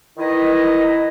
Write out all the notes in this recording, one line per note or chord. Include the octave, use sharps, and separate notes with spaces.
D#3 E4 B4 D#5